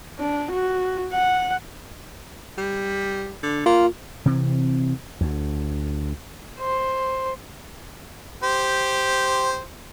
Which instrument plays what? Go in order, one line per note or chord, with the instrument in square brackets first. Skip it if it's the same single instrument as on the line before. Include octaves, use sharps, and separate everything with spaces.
[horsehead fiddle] D4
F#4
F#5
[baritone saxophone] G3
D3
[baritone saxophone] A#3 [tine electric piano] F4
[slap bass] C3 E3 C4
D2
[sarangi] C5
[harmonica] G4 C5